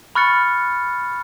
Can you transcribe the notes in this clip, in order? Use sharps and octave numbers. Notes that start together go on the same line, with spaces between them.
B5 C#6 F6 F#6 A6 C#7